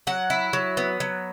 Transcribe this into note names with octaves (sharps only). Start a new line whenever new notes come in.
F#3 F#5
E4
F#3
B3
F#3